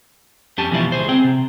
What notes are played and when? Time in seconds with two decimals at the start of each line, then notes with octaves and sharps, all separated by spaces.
0.58 F2 C#4 G4 G#5 A5
0.71 B2 E3 F3 G3 E4 F4
0.92 C#2 G#4 C5
1.09 C4 G#4 G5
1.24 C3